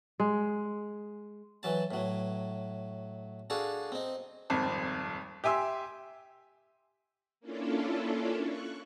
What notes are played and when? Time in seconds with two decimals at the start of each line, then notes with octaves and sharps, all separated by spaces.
0.20 G#3
1.63 E3 F#3 A5
1.91 A2 F#3
3.50 D4 F#4 G#4 A4 F5
3.92 C4 D#4
4.50 D#1 G#1 F2 A5
5.44 G4 E5 G#5 C6 E6
7.40 A#3 C#4 D4 E4 F4 A4
8.39 C#6 F#6